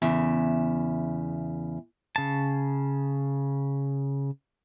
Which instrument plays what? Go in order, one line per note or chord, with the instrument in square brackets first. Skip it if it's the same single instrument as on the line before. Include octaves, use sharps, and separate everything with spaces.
[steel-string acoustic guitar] E2 C#3 E5
[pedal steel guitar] C#3 A5